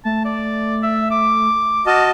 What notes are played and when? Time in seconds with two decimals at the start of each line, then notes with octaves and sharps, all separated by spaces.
0.05 A3 A5
0.25 D5
0.83 E5
1.11 D6
1.86 F#4 D#5 A5 F6